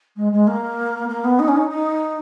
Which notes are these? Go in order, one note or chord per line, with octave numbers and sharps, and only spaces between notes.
G#3
G#3
A#3
A#3
B3
D#4
C#4
D#4
D#4